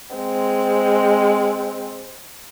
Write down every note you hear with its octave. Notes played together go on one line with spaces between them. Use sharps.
G#3 C4